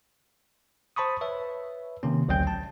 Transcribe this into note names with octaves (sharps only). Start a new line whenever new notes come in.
C5 A5 B5 C#6 D#6
B4 C#5 E5
C3 D#3 A#3 C#4
A1 D2 F#3 C#4 G5 G6
A5